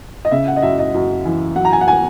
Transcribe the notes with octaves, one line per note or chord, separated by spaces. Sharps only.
D#5
C#3 E5
F#5
D#5
F#2 E5
D#5
F#2
E3
F#3 F#5
A#5
G#5
F#5
G#5